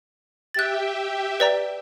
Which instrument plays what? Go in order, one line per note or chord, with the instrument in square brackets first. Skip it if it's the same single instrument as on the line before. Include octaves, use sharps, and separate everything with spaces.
[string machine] G4 E5 G5 [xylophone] F#6 A6
[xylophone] B4 D5 A#5